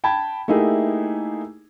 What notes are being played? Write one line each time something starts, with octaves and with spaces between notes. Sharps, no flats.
G5 A5 B5 G#6
A3 A#3 D#4 E4 G4 G#4